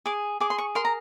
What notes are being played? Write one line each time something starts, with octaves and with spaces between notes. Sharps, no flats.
G#4 D6
G#4 D6
C6
C#6
A#4 C6
A#5